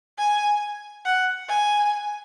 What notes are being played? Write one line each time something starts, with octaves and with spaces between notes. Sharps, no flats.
G#5
F#5
G#5